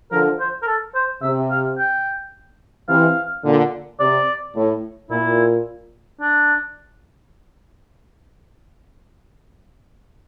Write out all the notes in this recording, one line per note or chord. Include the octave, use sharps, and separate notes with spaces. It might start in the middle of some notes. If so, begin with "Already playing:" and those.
D3 F3 A#4
C5
A#4
A4
C5
C3 E5
F5
G5
C3 E3 F5
A#2 D3
C3 D5
A2
A#2 E4
D4